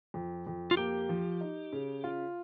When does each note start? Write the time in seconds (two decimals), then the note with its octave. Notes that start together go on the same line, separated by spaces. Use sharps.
0.14 F2
0.47 F2
0.71 F4
0.77 A#3 G4
1.09 F3
1.41 D#4
1.73 C#3
2.04 F4